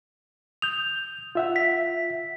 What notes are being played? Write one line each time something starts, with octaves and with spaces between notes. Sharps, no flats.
D#6 G6 F7
F4 E5 F#5
B6